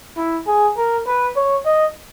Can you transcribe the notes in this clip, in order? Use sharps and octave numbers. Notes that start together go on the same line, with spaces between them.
E4
G#4
A#4
B4
C#5
D#5